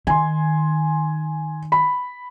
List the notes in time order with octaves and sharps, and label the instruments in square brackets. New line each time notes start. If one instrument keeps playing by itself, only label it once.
[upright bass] D#3 [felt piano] G#5 C6
[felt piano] B5